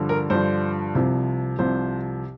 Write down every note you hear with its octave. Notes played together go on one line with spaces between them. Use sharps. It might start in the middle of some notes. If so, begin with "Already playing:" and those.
Already playing: G2 D3 F3
A#4
G2 D3 F3 C5
C2 C3 F3
C2 C3 F3 C5